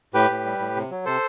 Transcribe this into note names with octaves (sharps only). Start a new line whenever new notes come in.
A2 G4 B4
A2
G3
A2
C3
F#3
C3 A4 C5